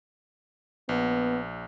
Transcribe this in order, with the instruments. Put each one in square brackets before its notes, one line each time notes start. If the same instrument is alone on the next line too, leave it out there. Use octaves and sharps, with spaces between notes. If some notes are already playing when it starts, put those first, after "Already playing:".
[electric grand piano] A#1 [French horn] B3